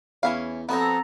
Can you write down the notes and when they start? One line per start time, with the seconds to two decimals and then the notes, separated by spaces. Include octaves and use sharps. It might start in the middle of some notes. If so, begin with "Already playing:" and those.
0.23 E2 C#4 E4 F5
0.69 F2 B3 C4 F#4 A4 A#5 D#6